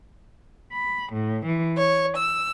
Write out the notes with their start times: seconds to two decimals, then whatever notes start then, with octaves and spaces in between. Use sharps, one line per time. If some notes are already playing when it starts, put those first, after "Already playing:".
0.71 B5
1.12 A2
1.45 E3
1.77 C#5
2.16 E6